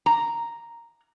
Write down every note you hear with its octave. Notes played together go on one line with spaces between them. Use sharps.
A#5